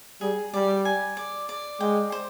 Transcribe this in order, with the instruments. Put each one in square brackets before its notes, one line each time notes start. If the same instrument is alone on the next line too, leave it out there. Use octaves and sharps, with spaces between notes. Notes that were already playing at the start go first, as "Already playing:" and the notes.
[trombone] G3 [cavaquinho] G#4
[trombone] G3 [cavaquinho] D5
[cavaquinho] G#5
D5
D5
[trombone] G#3 [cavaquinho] G5
[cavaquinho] C5